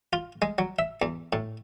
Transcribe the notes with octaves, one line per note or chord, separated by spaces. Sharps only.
F4
G#3
F#3
E5
E2
A2